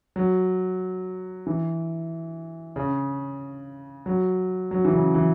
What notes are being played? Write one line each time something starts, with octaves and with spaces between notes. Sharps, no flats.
F#3
E3
C#3
F#3
F#3
E3
C#3
E3